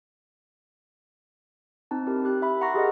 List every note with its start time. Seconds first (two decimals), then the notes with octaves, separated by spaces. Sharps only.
1.91 C4 D#4 A5
2.07 E4 G4 A#4
2.25 G4 F#6
2.42 E5 B5
2.61 F#5 A#5 C6 C#6 A#6
2.74 G4 G#4 A#4 D#5 F#5